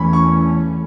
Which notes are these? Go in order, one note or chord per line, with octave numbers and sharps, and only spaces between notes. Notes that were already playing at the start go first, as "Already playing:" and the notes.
Already playing: E2 E3 A3 C#4 B5
C#6